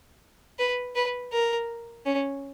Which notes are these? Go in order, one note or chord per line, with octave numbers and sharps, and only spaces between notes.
B4
B4
A#4
C#4